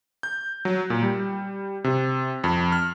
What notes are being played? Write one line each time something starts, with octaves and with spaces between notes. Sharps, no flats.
G6
F#3
A#2
G3
C3
F2
F6